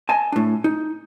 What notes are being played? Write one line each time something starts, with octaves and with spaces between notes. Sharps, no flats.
D#5 G#5 A5
A2 D4
D#4